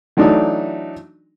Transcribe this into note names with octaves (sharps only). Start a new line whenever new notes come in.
E3 F#3 A3 D4 D#4